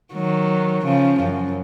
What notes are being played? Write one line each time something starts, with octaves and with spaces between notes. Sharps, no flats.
D#3 F#3
C#3 F3
F#2